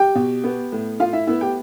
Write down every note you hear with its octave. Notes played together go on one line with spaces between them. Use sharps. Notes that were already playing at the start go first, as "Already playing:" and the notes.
Already playing: G4 G5
B2
B3
A2
A2 F4 F5
E4 E5
B3 E4 E5
G4 G5